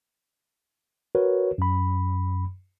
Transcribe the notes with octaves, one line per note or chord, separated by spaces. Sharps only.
F#4 A#4 B4 C#5
F#2 B5